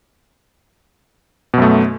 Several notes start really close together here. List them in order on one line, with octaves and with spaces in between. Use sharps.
B2 F#2 A3